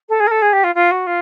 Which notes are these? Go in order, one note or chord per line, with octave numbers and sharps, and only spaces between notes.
A4
G#4
A#4
A4
G#4
G4
F4
F4
F#4
F4